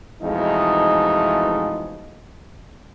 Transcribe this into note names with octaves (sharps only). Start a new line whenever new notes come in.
F2 B2 E3 G#3 A3 D#4